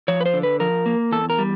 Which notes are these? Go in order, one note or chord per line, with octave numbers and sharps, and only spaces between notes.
F3 C#5
B4
C5
D3
B4
F3 A#4
A#3
E2 A4
A#4
G3